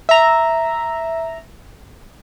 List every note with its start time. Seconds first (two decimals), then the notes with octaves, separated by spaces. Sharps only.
0.09 E5 A#5